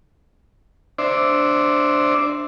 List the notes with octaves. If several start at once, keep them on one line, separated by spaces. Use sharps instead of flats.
D4 C5 D5 E5